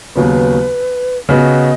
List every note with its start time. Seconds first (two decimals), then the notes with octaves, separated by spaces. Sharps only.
0.16 D#2 C#3 F#3 B3 B4
1.29 C#3 B3 F#4 D#5